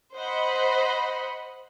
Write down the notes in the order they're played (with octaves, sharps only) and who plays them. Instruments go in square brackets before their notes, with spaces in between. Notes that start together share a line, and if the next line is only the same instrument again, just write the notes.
[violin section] C5 D#5 F#5 B5